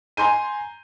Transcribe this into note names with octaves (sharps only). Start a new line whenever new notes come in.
G#5 A#5 C6 G6 D#7